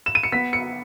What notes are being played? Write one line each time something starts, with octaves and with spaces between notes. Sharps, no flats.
E7
D#7
C#7
B3 B6
C#7